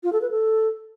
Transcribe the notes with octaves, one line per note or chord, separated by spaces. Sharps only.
F4
A4
B4
A4